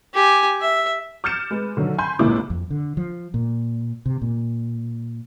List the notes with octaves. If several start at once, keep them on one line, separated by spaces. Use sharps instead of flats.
G4 G#5
E5
D6 F6 G6 A6 C#7 E7
G#3 B4
D3 D#3 F#3
G#5 B5 C6 G6
G1 C#2 A#2 A#3 E4 D6
F2
D3
F3
A#2
C3
A#2